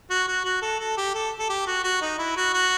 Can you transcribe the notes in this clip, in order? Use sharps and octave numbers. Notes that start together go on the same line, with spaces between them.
F#4
F#4
F#4
A4
A4
G4
A4
A4
G4
F#4
F#4
D#4
E4
F#4
F#4